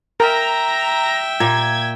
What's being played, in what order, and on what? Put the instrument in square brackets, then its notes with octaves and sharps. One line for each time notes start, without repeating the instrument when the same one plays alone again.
[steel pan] A#4 [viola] E5 G5 [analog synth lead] A#5
[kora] A#2 [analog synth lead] G#6